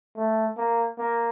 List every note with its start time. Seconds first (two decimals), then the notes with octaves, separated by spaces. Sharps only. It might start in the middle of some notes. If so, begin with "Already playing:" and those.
0.17 A3
0.57 A#3
0.98 A#3